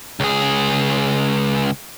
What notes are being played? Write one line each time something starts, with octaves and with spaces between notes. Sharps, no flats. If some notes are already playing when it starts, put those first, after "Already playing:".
C#2 G#4